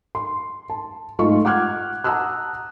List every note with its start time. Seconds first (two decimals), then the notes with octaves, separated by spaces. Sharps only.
0.15 C6
0.70 A5
1.19 G#2 A3 F4 D#5 C#6
1.45 F#5 D6 F6 F#6 G#6
2.04 F#5 A5 A#5 D#6 E6 F#6